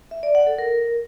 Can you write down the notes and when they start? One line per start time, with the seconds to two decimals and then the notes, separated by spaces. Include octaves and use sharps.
0.11 E5
0.23 D5
0.35 F#5
0.47 A4
0.58 A#4